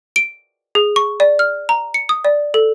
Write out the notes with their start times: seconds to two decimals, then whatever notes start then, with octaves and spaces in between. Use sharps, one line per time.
0.16 D7
0.75 G#4
0.96 C#6
1.20 D5
1.39 F6
1.69 A#5
1.94 C#7
2.09 D#6
2.25 D5
2.54 A4